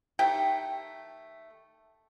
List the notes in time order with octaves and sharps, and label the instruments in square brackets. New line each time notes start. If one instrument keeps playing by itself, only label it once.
[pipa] D#3 A3 G4 G5